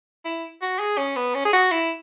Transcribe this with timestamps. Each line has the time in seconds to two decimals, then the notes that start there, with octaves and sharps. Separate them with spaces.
0.25 E4
0.62 F#4
0.79 G#4
0.98 C#4
1.16 B3
1.35 C#4
1.45 G#4
1.53 F#4
1.72 E4